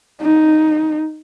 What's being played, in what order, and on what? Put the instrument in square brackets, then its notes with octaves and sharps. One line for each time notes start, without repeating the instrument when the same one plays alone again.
[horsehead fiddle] D#4